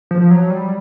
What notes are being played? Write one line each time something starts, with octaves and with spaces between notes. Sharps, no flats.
F3
F#3
G3